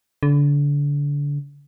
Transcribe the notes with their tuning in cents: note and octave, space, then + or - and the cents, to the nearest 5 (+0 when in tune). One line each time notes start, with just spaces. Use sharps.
D3 -30